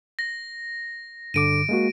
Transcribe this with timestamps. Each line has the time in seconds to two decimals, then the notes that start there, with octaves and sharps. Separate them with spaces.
0.19 A#6
1.34 G2 D3 D6 D7 D#7
1.69 G#3 A#3 F#4